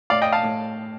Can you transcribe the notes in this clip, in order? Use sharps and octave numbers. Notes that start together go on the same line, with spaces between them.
A2 D5 F5
D#5 G5
F5 A5
A2